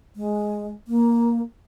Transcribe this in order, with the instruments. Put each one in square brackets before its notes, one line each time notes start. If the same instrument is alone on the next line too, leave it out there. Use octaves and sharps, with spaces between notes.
[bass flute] G#3
A#3